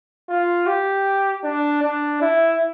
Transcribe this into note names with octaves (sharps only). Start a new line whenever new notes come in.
F4
G4
D4
D4
E4